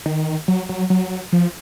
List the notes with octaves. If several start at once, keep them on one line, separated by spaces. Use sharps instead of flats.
D#3
F#3
F#3
F#3
F3